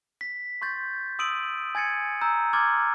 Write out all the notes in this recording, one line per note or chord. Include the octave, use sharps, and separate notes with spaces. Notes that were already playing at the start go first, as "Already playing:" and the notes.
B6
C6 C#6 G6 A6
C6 D#6 E6 D7 D#7 F#7
G#5 G#6 A6 C#7 D#7
A#5 E6 G6
C6 D6 F6 G#6 A6